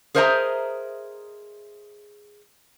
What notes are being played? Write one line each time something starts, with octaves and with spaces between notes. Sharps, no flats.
G#4 A#4 C5 D#5 E5 A#5